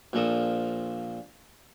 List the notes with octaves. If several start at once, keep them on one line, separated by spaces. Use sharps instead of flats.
A#1 A#2 F3 A4 A#4 D#6